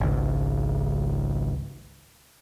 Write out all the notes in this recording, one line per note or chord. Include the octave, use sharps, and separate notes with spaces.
G#1 C#2